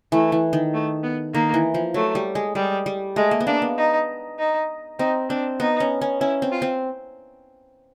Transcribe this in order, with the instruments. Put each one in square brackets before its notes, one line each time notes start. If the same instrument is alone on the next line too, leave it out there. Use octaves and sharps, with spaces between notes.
[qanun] E3 [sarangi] A3
[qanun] E3
D#3
[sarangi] A3
B3
[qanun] D#3 [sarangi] A#3
[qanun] E3
F3
[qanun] F#3 [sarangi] A3
[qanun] G3
G#3
[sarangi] G3 [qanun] G#3
[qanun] G3
[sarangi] G#3 [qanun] A3
[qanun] A#3
B3
[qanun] A#3 [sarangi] D4
[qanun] B3
[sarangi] D#4
D#4
[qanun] C4 [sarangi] D#4
[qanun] C4 [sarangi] D4
[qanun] B3 [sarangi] D#4
[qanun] C#4
C#4
[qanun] C#4 [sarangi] E4
[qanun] C4
[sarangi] F4
[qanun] C4